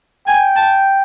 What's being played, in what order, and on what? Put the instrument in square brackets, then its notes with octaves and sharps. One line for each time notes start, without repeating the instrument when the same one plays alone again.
[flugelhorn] G5 [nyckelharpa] G#5
[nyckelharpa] A5